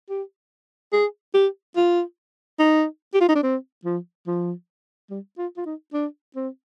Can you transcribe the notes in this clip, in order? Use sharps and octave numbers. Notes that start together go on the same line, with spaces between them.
G4
G#4
G4
F4
D#4
G4
F4
D#4
D4
C4
F3
F3
G3
F4
F4
D#4
D4
C4